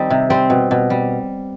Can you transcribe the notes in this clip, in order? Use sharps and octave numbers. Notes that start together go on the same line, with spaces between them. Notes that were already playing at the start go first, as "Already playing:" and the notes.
Already playing: D#3 G3 C4 D#4
C3
G3 C4
B2
B2
G3